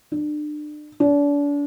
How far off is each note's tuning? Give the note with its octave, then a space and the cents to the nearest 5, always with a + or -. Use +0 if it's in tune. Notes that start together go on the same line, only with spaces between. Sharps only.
D4 +35
D4 -35